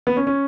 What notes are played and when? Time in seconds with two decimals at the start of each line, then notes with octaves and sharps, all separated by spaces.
0.07 B3
0.17 C#4
0.27 C#4